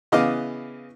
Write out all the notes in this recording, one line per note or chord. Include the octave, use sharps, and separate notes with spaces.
C#3 E3 B3 D#5 F5 D6